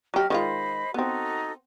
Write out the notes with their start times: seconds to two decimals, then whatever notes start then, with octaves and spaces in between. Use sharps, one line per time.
0.14 F#3 G4 D#5 A#5 F6
0.30 D#3 G#3 F4 C5 D#5 B5
0.94 B3 C4 D#4 F#4 A4